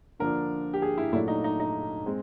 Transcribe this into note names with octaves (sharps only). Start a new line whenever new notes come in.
D3 F3 A#3 D4 A#4
G4
G#4
E4
A#2 F#3 A3 D4 E4
D#4
D#4
D#4
G#3 C4